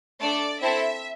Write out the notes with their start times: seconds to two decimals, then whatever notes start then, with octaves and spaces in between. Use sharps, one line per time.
0.20 A3 D4 A4 D5
0.61 C4 E4 A4 E5